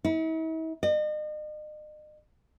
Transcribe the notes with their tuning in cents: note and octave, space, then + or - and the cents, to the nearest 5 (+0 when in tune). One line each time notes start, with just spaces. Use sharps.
E4 -45
D#5 -40